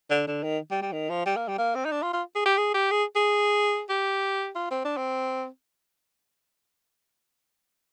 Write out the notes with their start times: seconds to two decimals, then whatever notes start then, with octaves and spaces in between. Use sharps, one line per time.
0.11 D3
0.27 D3
0.43 D#3
0.71 G3
0.82 G3
0.92 D#3
1.10 F3
1.26 G3
1.36 A#3
1.48 G3
1.58 A#3
1.75 C4
1.85 D#4
1.92 D4
2.02 F4
2.13 F4
2.35 G#4
2.46 G4
2.57 G#4
2.74 G4
2.91 G#4
3.16 G#4
3.89 G4
4.56 F4
4.71 C4
4.85 D4
4.97 C4